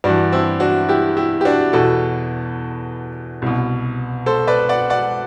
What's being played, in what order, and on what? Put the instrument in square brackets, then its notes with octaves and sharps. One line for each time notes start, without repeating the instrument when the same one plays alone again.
[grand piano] G2 E3 D4 F#4
C4 E4
D4 F#4
E4 G4
E4 G4
G4
D4 F#4
E2 B2 F#4 A4
C2 B2
A4 C5
B4 D5
D5 F#5
D5 F#5